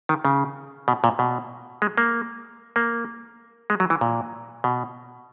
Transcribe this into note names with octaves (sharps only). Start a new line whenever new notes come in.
D#3
C#3
B2
A#2
B2
G#3
A#3
A#3
G#3
F#3
E3
A#2
B2